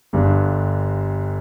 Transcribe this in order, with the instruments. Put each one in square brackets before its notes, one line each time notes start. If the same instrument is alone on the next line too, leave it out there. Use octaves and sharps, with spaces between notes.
[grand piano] G1 G2 D3